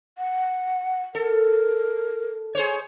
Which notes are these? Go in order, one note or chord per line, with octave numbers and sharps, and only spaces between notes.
F#5
A4 A#4
G#4 C5 C#5